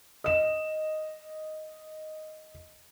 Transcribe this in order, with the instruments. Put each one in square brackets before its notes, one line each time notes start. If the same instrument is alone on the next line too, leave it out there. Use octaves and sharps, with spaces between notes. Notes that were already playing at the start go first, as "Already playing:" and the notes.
[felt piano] D#5 E7